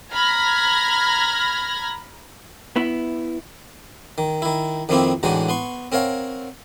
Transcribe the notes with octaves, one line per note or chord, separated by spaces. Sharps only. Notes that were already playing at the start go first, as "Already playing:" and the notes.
A#5 B5 F6 G#6 A#6
B3 E4
D#3
D#3 E4
F2 D#3 F3 A#3 C4 E4
A2 D3 E3 G#3 D#4 F#4
B3 C6 C#6
C4 A#4 C#5 F5 F#5